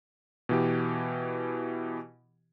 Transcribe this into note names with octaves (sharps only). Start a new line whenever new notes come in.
B2 E3 G4